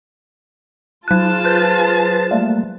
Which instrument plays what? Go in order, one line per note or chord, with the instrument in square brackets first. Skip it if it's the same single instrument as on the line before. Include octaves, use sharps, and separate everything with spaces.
[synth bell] F#3 F#6 [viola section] F4 G#4 A5
[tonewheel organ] B4 C5 A6
G3 A3 A#3